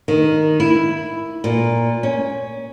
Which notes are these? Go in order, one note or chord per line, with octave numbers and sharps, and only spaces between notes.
D#3
E4
A#2
C#4